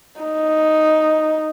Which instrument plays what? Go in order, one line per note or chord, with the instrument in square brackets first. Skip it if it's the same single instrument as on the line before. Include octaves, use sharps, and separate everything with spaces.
[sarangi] D#4